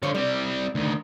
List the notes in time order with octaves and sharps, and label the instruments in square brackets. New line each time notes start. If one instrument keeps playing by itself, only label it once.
[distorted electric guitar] D3 F4 [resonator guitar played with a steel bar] C5 C#5
[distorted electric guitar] G3 C4 [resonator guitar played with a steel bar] D5
[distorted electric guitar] D2 D#3